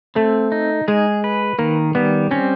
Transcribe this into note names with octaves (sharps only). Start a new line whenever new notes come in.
A3 C4
D#4
G#3 G#4
B4
D#3 A#3
G3 B3
C4 C#4